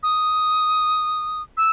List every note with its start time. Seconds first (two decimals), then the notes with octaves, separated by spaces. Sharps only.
0.03 D#6
1.57 E6